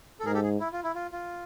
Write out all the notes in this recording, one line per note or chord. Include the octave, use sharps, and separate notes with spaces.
A4
G#2 G#4 A#4
G4 A4
G#4
E4
F4
E4
F4
F4